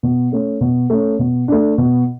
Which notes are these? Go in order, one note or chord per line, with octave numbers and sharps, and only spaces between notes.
B2
A3 C#4
B2
A3 C#4
B2
A3 D4
B2